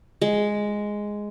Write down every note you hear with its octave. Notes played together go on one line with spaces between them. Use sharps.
G#3